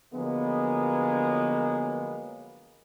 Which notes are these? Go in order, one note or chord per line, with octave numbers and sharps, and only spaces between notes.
D3 F3 F#3 G#3 A#3 B3